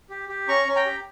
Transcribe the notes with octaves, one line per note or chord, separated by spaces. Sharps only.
G4
G4
C#4 A#5 C#6
C#4
G5 A#5
G4